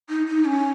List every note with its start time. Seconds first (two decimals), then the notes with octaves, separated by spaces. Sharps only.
0.09 D#4
0.27 D#4
0.45 C#4